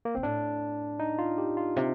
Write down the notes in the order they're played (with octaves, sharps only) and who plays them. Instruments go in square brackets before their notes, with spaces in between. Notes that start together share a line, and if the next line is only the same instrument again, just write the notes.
[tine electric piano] A#3
[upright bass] A#2 [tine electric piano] C4
[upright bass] A2 [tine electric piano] D4
[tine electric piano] D#4
F4
G4
F4
[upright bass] C3